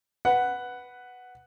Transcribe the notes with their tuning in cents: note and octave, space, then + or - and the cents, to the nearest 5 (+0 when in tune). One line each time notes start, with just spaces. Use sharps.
B4 +0 F#5 +0